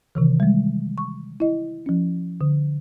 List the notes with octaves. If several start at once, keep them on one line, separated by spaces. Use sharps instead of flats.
C3 D#3 E3
G3 G#3
C#6
E4 D#5
F3 C#4
D3